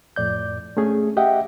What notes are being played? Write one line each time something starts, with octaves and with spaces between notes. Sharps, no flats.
F2 A2 D5 G6
A3 C#4 G#4
G4 D#5 E5 F#5 G5